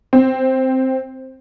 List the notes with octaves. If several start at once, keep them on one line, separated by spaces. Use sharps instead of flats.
C4